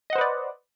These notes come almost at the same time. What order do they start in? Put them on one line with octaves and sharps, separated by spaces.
D#5 F#5 C5 B4 D5